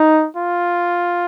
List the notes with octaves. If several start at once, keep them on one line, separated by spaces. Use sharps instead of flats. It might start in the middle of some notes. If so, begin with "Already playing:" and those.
Already playing: D#4
F4